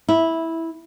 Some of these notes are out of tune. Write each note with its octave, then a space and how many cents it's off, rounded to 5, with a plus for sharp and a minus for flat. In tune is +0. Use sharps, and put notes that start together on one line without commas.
E4 -10